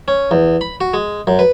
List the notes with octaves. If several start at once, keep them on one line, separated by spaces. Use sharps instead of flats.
C#4
E2
B5
F#4
G#3
F#2
B4